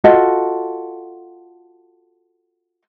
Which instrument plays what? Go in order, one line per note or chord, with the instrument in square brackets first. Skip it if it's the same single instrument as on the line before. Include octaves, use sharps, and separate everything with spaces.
[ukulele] F4 F#4 A4 D#5